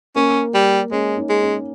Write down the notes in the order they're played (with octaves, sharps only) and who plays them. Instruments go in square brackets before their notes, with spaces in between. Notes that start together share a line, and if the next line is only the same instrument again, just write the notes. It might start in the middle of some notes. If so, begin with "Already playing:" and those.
[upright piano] A#3 [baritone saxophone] C#4
[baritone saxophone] G3
[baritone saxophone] G#3 [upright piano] C#4
[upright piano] D#4
[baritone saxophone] G#3
[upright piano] C#4